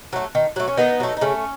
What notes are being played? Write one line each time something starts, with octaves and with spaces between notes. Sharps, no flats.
F#3 A3
D#3
F#3 A3
C#4
D#3 B3 D#4
F#3 A3
D#4
C#3 A3 C#4